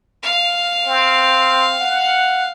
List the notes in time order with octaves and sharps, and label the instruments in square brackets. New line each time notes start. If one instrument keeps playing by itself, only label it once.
[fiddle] F5
[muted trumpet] C4
F#5